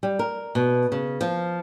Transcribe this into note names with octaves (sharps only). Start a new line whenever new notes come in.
G3
A#4
B2
C#3
F3